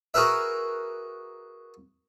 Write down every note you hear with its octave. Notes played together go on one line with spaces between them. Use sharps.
F#4 G#4 A#4 B4 E5